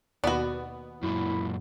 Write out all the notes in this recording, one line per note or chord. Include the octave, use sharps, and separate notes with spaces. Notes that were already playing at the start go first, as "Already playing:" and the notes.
D#2 B2 B3 F#4 D5
F#2 A#2 E4